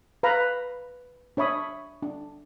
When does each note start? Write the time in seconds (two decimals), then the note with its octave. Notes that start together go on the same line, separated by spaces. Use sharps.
0.23 B4 F5 A#5 B5
1.37 D4 C#5 E5 B5 D#6
2.02 D4